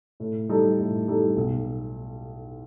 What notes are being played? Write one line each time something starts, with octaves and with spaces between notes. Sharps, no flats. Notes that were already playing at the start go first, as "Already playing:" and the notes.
A2
G3 D#4 A4
A2
G3 D#4 A4
B1